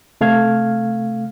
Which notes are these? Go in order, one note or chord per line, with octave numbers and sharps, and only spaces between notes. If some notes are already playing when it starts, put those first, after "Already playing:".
C3 A3 F5 F6 G#6